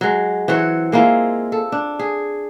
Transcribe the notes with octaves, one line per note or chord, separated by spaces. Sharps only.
F#3 G#3
E3 F#3 C4 C#5
G#3 A#3 E4 F4
A4
D4
G#4